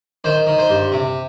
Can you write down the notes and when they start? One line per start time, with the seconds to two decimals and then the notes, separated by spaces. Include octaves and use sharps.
0.24 D#3 C5
0.47 D#3
0.59 C5
0.70 G2
0.92 C3